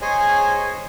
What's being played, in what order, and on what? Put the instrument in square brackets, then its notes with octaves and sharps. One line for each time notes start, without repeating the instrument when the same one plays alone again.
[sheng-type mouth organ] G#4 C5 C#5 D#5 G#5